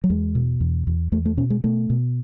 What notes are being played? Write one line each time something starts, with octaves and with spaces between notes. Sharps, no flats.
F#3
E2 G#3
B2
E2
E2
E2 A3
A3
B2 C#4
G#3
B2 A3
B2